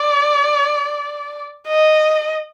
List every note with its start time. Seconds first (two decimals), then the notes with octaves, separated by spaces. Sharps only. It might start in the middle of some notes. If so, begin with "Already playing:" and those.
Already playing: D5
1.68 D#5